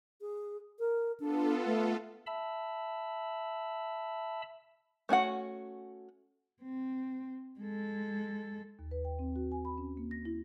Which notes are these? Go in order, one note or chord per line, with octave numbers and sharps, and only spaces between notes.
G#4
A#4
B3 D4 F4 A4
A3
E5 A5 B5 E6
A3 C#4 F#4 F#5
C4
G#3 A4
D#2
B4
G5
C4
F#4
G#5
B5
C#4
A#3
A#6
E4